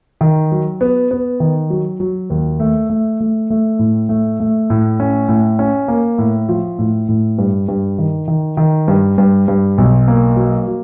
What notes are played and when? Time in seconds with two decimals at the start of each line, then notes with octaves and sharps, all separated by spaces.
0.21 D#3
0.52 F#3
0.81 B3
1.11 B3
1.40 D#3
1.70 F#3
2.00 F#3
2.30 D#2
2.60 A3
2.90 A3
3.20 A3
3.50 A3
3.79 A2
4.09 A3
4.40 A3
4.70 A2
5.00 C#4
5.29 A2
5.59 C#4
5.88 A#3
6.18 A2
6.49 F3
6.79 A2
7.08 A2
7.38 G2
7.68 G2
7.98 D#3
8.28 D#3
8.57 D#3
8.88 G2
9.18 G2
9.48 G2
9.78 B1
10.08 A#3
10.37 F#3
10.68 F#3